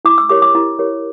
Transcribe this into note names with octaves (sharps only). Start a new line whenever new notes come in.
E4 D6
E6
G4 A#4 C#5 D6
D6
E4
G4 A#4 C#5